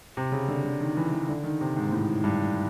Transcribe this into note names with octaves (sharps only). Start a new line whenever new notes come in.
C3
C#3
D3
D3
D#3
E3
E3
D3
D#3
C3
G#2
A2
G2